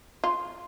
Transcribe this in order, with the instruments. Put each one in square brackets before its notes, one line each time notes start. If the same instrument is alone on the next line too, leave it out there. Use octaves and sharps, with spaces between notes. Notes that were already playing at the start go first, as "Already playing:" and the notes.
[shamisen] F4